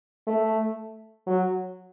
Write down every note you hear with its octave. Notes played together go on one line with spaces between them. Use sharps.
A3
F#3